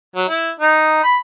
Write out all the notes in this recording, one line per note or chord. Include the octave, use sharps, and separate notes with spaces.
F#3
E4
D#4
B5